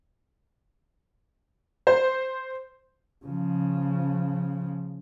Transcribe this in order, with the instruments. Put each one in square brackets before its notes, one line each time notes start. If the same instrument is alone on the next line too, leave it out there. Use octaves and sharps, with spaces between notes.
[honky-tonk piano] C5
[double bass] C#3 F3